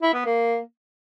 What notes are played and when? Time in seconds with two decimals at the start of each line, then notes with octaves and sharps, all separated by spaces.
0.02 E4
0.14 B3
0.25 A#3